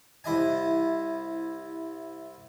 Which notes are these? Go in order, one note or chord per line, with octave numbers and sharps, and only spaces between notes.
C2 E4 D#5 G#5